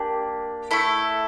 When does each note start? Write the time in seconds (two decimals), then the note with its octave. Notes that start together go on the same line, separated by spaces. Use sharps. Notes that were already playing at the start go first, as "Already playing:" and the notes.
Already playing: A#3 D4 G4
0.71 A3 E4 A4